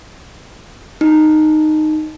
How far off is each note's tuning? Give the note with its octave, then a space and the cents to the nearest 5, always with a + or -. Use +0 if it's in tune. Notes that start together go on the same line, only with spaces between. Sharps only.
D#4 -10